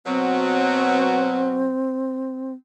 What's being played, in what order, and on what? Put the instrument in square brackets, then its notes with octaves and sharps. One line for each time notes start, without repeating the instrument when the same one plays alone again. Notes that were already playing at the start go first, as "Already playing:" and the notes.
[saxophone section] B2 F#3 [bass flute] C4